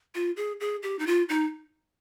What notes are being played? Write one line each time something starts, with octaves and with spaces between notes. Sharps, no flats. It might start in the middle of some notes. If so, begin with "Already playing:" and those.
F4
G#4
G#4
G4
D#4
F4
D#4